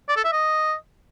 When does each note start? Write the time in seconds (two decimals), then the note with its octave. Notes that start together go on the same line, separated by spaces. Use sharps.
0.09 D5
0.17 A4
0.24 E5
0.32 D#5